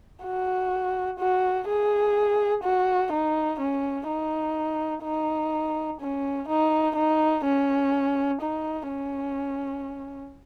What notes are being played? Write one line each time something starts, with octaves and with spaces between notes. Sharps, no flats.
F#4
F#4
G#4
F#4
D#4
C#4
D#4
D#4
C#4
D#4
D#4
C#4
D#4
C#4